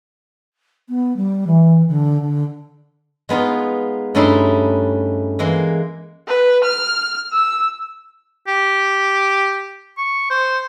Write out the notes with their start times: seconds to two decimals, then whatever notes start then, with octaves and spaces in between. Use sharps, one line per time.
0.89 B3
1.16 G3
1.47 E3
1.88 D3
2.21 D3
3.29 G#3 B3 D#4 F4
4.15 G2 A3 C#4 D#4 E4 C6
5.39 E3 G#3 A#3
6.27 B4
6.63 F6
7.32 E6
8.48 G4
9.98 C#6
10.30 C5